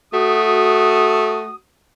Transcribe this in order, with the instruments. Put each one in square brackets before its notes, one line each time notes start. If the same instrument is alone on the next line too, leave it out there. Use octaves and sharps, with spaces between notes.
[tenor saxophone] A3 [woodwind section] F#4 D#6